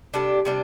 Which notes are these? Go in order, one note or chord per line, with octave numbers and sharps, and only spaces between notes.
C3 G3 D4 A4
C3 G3 D4